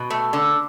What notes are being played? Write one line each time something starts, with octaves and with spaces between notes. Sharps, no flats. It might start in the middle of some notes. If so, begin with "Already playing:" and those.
Already playing: B2
A3
D3